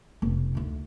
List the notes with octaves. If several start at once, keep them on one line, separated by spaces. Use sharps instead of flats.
F1 B1
D2 D#3